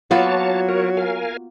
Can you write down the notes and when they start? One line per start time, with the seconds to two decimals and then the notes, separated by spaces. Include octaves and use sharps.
0.11 F#3 A#3 B3 F4 F#4 C#5 A5
0.69 A#4 C#5
0.97 A#4 F5 G#5